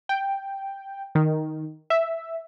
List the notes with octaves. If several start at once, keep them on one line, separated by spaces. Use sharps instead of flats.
G5
D#3
E5